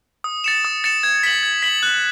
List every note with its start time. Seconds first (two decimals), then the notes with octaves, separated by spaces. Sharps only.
0.24 D#6
0.44 A6 C#7 E7
0.65 D#6
0.84 A6 C#7 E7
1.03 G#6
1.23 B6 F#7
1.43 G#6
1.63 B6 F#7
1.83 F#6